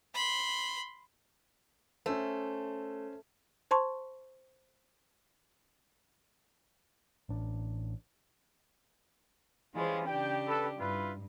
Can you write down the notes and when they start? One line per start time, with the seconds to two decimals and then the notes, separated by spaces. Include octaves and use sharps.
0.14 B5 C6
2.06 A3 C#4 C5
3.71 C5 A5 C6 C#6
7.29 A1 D4
9.74 E3 G3 G#3 C#4 F4 C5
10.06 C#3 D4 G4 G5
10.47 A4 B4
10.79 G2 E4 F4 B4